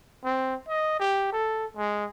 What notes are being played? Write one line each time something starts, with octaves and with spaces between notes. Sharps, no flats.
C4
D#5
G4
A4
G#3